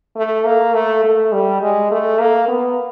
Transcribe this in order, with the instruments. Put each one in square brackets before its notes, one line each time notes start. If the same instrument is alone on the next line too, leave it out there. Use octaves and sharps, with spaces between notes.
[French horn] A3
A#3
A3
A3
G3
G#3
A3
A#3
B3